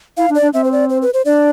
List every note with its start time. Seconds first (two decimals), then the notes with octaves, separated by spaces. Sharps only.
0.17 E4 F5
0.30 D4
0.35 D5
0.42 D4
0.54 C4 E5
0.64 C5
0.72 D5
0.90 C5
1.02 B4
1.14 C5
1.25 D4 D5